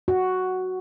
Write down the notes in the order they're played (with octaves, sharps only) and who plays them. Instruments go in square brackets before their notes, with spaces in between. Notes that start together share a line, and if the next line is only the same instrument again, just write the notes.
[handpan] F#4